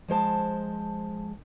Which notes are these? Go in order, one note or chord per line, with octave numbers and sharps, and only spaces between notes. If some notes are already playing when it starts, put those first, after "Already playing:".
F3 G#3 C5 A5